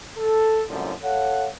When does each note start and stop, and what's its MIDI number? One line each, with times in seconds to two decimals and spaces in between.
0.18 0.64 69
0.69 0.93 36
0.69 0.93 42
0.69 0.93 45
0.69 0.93 50
0.69 0.93 53
1.03 1.49 69
1.03 1.49 73
1.03 1.49 77
1.03 1.49 78